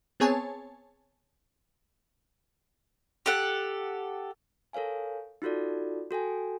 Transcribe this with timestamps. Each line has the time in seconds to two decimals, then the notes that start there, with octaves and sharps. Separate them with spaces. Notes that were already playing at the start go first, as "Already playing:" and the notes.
0.20 B3 C4 G#4 C#5 G#5 A5
3.26 G4 A4 F#5
4.73 A4 A#4 C#5 F5 G#5
5.42 D#4 F4 F#4 A4 D5
6.11 F#4 A4 G5 G#5